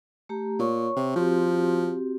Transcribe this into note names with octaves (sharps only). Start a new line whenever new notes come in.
A3 G4 A#5
A#2 C#5 C#6
C3
F3 C4 F#4 G4